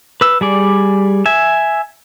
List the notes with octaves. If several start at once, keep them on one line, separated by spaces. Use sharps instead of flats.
B4 E6
G3 G#4 D5
E5 G#5